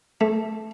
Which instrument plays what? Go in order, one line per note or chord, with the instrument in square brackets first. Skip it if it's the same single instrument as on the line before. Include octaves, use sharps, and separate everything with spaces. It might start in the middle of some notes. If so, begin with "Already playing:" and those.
[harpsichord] A3